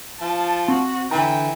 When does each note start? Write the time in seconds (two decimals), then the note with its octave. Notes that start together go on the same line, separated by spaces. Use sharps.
0.21 F3 A5
0.68 C4 F#4
1.11 D3 E3 G5 A#5